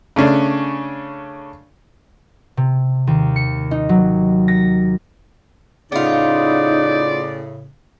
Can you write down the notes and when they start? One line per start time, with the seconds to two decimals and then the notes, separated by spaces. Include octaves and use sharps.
0.16 C#3 A3 C#4 D4
2.57 C3
3.07 D#2
3.36 C#7
3.71 D#4
3.89 F#3
4.48 A#6
5.92 A2 C#3 B3 D#4 F4 D5